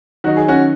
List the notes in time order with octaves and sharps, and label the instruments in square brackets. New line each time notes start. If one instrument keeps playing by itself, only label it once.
[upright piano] D#3 F#3 D#4 [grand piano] F#4
[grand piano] G#4
C#4 F#4